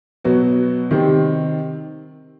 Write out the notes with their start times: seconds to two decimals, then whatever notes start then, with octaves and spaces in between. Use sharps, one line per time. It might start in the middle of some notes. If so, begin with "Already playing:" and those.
0.24 B2 F#3 B3 F#4
0.91 C3 D#3 G3 C4